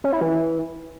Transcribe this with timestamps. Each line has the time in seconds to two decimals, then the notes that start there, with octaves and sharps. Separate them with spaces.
0.04 C#4
0.13 E4
0.21 E3